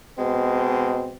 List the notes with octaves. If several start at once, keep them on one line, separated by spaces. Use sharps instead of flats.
B2 G#3 C4